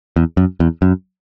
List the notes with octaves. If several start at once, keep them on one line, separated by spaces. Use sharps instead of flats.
E2
F#2
E2
F#2